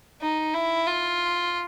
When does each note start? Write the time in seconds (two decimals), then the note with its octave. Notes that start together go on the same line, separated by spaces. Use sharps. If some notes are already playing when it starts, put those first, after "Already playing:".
0.21 D#4
0.54 E4
0.87 F4